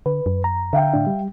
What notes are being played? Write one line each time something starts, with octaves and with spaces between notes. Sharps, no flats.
D3 B4
F#2
A#5
D3 E5 F5 G5
A2 D4
G3